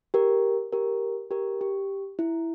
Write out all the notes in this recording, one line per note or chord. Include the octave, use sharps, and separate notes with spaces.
G4 A#4
G4 A#4
G4 A#4
G4
E4